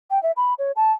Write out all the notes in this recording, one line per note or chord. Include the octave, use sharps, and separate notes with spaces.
G5
E5
B5
C#5
A5